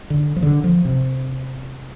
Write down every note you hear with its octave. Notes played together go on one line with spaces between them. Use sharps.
D3
F3
D3
F3
C3